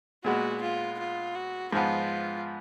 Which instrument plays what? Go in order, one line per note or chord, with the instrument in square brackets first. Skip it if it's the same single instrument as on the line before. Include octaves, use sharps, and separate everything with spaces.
[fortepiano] A#2 G#3 B3 [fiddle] F#4
[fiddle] F4
F4
F#4
[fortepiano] G#2 F3 B3 [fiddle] F4